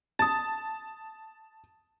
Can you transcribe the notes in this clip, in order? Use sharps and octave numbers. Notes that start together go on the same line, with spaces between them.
A5 D#6 A6